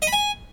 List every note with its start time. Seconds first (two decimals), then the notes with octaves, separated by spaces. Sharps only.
0.02 D#5
0.07 B5
0.13 G#5